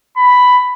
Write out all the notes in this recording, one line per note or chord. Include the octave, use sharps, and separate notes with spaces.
B5